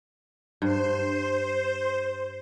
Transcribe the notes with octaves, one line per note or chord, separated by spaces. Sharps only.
G2 C5